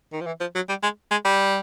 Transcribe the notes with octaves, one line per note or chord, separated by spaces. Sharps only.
D#3
F3
E3
F3
F#3
G3
G#3
G#3
G3